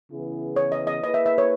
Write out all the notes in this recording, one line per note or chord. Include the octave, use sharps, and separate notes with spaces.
C#3 E3 B3 E4 G#4
C#5
D#5
D#5
A#3 E4 G#4 B4 D#5
E5
E5
C#5